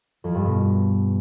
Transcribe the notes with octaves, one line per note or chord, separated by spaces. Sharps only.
F2
G2
B2